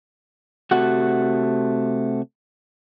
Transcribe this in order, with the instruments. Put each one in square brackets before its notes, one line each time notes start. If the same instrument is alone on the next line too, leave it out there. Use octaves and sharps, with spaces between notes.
[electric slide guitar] C3 A3 F#4 F#5